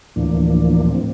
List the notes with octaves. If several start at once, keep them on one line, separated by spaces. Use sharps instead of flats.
D2 A2 E3 F3 A#3 D4
A2 C4